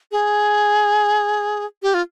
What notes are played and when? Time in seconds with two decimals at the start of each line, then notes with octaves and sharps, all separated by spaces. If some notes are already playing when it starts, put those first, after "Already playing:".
0.12 G#4
1.83 G4
1.94 F4